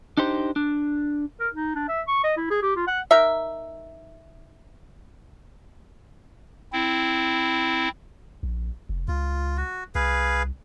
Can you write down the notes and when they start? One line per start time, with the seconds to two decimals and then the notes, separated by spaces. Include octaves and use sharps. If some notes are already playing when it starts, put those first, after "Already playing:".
0.17 D4 D#4 G4 C5
0.56 D4
1.40 A#4
1.54 D#4
1.75 D4
1.88 E5
2.08 C#6
2.24 D#5
2.37 E4
2.50 G#4
2.62 G4
2.76 F4
2.88 F#5
3.11 D#4 A#4 E5
6.73 C4 E4
8.43 A#1
8.89 F1
9.08 C#2 F4
9.57 F#4
9.95 C2 G#4 B4 F5